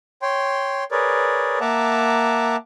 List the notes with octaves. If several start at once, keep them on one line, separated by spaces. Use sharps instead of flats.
C#5 G5 C6
G#4 A#4 B4 C#5 D5
A#3 E5 F#5 A5 A#5 D6